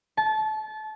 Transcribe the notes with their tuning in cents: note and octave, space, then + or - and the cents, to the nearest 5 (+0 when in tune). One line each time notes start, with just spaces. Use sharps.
A5 -25